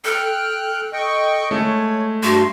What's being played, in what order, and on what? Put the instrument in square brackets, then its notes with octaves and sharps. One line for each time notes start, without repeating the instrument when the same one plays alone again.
[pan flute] A4 [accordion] G5 F6 F#6
[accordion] D#5 G5 C#6
[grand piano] G#3 A3 [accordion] C#5
[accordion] G2 A3 C6 [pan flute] F#4